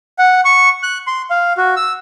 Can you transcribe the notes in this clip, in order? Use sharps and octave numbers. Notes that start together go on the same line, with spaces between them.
F#5
C#6
F#6
C6
F5
F#4
E6